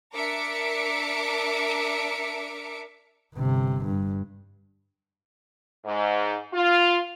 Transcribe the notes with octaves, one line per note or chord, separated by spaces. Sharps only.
D4 A#4 E5 D6 C#7 D7
G1 C3
G2
G#2
F4